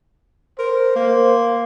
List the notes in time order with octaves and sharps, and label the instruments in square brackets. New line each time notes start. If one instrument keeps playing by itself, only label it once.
[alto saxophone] A#4 [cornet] C5
[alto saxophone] A#3